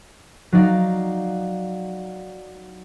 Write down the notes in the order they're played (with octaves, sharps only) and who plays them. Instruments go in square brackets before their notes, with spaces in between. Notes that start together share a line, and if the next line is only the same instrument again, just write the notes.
[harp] F#3 D#4 D5 F5